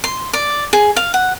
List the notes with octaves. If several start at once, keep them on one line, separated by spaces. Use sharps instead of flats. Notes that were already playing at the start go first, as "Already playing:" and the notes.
C6
D5
G#4
F5
F#5